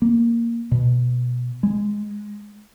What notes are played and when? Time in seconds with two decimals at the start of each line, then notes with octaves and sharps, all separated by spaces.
0.02 A#3
0.71 B2
1.63 G#3